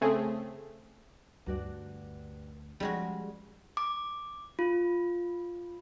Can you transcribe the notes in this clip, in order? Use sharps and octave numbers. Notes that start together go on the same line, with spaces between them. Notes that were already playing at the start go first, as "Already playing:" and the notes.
C#3 A3 C4 G#4
D2 G2 F#4 D5
F3 G3 G#3 C#4 F#4 G#4
D6
F4